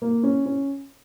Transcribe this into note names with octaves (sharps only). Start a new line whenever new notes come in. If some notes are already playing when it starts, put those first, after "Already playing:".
A#3
C#4
C#4